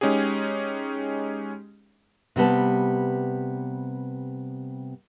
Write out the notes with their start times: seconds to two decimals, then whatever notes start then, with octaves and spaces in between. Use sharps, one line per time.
0.01 G#3 C#4 D#4 G4 G#4
2.36 C3 G3 B3 A5